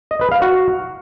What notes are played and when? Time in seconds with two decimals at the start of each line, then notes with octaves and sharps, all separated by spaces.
0.11 D#5
0.21 B4
0.32 F5
0.42 F#4